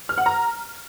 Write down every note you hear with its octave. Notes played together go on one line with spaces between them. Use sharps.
F6
F#5
A#5